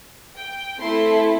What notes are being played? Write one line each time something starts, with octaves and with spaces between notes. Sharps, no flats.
G5
A3 C4 E4 A4 C6